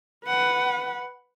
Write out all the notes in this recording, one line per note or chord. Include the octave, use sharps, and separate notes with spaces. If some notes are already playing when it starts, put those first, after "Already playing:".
B4 F#5